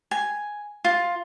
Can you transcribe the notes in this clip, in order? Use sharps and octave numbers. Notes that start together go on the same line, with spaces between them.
G#5
F4